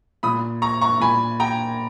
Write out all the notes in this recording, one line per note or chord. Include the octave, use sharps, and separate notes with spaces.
A#2 B5 D#6
A#5 C#6
A#5 C#6
A#2 G#5 B5
G5 A#5